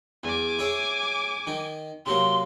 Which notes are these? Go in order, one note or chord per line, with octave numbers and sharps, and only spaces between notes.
E2 G#5 D6
E4 G#4 C#5
D#3 D#4
C3 F#3 A#3 C6